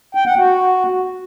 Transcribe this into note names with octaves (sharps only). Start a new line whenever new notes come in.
G5
F#5
F#4